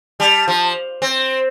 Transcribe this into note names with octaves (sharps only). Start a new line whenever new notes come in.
G3 A5
F3
C4